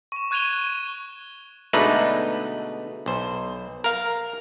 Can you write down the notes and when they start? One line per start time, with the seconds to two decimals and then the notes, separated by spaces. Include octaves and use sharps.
0.12 C#6 E7
0.31 C#6 F#6 G#6 D#7 F7 G7
1.73 B2 D3 G#3 A3 D#4 B4
3.06 B1 C5
3.84 A#4 F5